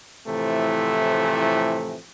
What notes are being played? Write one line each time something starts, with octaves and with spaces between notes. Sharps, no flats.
A2 C3 E3 F3 A3